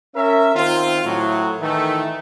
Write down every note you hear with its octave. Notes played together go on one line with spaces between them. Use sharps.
C#4 A#4 E5
D#3 C4 F4
A2 F#3
D#3 E3 A3